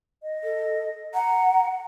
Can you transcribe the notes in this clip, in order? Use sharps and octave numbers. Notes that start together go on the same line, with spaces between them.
D#5
A4
F#5 A#5